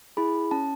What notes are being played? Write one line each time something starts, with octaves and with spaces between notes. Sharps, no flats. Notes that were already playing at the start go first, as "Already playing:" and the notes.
E4 G#4 B5
C#4 A5